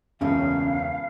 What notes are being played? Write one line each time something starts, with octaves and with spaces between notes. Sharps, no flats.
E1 C#2 A2 C#3 C#4 F5